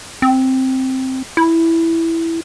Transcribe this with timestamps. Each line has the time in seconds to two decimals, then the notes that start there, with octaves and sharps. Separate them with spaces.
0.22 C4
1.37 E4